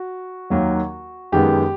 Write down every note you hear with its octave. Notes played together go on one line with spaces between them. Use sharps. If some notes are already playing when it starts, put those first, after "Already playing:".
Already playing: F#4
D#2 D#3 F#3 A#3
F#2 D#3 G#3 B3 G4